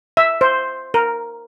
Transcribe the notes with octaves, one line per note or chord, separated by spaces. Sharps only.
E5
C5
A#4